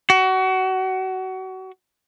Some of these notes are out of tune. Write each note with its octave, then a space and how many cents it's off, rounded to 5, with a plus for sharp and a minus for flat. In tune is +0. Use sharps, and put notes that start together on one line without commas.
F#4 +25